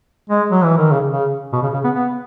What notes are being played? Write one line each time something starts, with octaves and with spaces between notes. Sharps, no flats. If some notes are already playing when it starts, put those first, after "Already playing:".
G#3
F#3
E3
D#3
C#3
C#3
B2
C#3
C#3
B3
B3